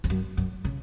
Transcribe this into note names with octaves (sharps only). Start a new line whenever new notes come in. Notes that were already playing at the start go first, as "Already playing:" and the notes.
F2
F#2
F#2
C#3